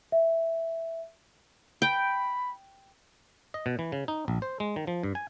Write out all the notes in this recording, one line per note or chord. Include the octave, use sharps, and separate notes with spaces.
E5
G5 B5
D#5
B2
E3
C#3
D#4
A#1
C5
G#3
D#3
F3
G2
G#5